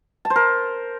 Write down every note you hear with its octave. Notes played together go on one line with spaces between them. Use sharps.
A5
C5
A#4